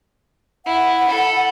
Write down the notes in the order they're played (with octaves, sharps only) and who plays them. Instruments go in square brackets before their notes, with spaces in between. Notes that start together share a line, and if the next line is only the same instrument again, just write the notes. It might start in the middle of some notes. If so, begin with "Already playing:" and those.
[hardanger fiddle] E4 [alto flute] F#5
[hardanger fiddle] A4 B5